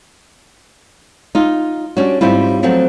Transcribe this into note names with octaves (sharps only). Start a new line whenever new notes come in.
D#4 F4
G3 C#4 D4 F#4
G#2 G3 C4 E4 F4
F3 F#3 A3 C4 F#5